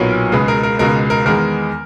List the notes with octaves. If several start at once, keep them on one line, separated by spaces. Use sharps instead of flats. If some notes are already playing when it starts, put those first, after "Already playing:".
Already playing: B1 A#2 F#3 B3 A#4 C#5
C#2 B2 G#3 G#4 B4
A#4
A#4
C#2 B2 G#3 A#4
A#4
E2 D#3 G#3 B3 A#4